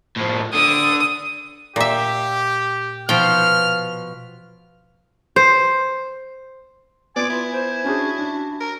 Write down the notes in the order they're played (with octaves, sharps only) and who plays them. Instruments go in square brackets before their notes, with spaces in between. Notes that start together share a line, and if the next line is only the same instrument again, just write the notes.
[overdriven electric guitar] A2 F3
[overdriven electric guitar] D3 [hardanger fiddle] D#6
[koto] A#2 E5 [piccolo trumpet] G4
[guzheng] B2 F3 [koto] G5 [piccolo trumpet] F6
[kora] C5
[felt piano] B3 D7 [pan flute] F4 [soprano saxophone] D5 [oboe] G#5
[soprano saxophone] E4 [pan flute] F4
[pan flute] C5 [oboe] G#5
[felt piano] C#4 D4 G#4 [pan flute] F#4
[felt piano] D4
[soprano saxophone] A#4